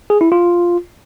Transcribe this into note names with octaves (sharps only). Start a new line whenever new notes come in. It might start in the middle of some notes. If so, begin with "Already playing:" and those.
G#4
E4
F4